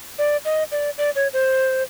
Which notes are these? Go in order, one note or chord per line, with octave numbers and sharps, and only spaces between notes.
D5
D#5
D5
D5
C#5
C5